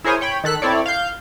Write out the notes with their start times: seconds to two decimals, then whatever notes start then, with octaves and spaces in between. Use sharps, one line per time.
0.04 E4 G#4 A#4 C5 C#5 G#5
0.21 C#5 G5 B5
0.44 D#3 A4 F#6 B6
0.62 C4 E4 A4 C#5 D5
0.86 F5 G6